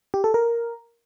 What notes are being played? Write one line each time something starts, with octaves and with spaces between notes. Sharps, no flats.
G4
A4
A#4